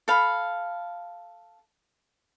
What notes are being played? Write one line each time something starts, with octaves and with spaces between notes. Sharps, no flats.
A4 F5 B5